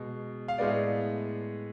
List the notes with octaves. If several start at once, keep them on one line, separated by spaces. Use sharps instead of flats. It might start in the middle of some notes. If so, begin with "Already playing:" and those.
Already playing: B2 G#3
F5
A2 G#3 B3 D5